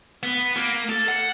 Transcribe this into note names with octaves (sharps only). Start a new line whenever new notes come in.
B3
A#3
A4
F#5